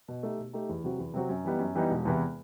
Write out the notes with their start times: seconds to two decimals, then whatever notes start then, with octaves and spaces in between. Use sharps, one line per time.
0.08 B2
0.23 A3 D#4 G4
0.39 B2
0.53 A3 D#4 G4
0.69 E2
0.84 C3 F#3 C4 F#4
0.99 E2
1.14 C3 F#3 C4 F#4
1.29 F#2
1.45 E3 G3 B3 D#4
1.59 F#2
1.75 E3 G3 B3 D#4
1.90 E1
2.05 E2 C3 E3 B3